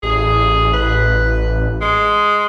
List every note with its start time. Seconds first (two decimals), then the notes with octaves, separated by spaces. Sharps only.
0.03 A1 G#4
0.74 B4
1.82 G#3